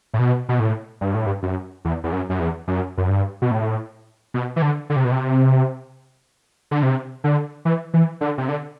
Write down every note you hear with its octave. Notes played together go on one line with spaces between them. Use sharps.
A2
B2
B2
A2
G2
A2
G2
F#2
E2
E2
F#2
F#2
E2
F#2
F#2
G2
B2
A2
B2
E3
D3
D3
C3
B2
C3
D3
C3
D3
E3
E3
D3
C3
D3